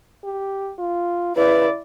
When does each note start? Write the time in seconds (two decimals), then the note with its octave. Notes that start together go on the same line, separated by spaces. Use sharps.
0.24 G4
0.78 F4
1.36 C#3 E4 B4 D5